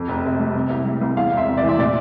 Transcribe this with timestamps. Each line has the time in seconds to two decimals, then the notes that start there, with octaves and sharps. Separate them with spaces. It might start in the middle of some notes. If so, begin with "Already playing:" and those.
Already playing: F2
0.08 F1
0.24 C3
0.40 G3
0.55 C3
0.70 C2
0.86 G3
1.01 C2
1.17 E2 F5
1.32 E1
1.37 E5
1.48 C3
1.57 E3 D5
1.69 E5
1.78 A#2 D5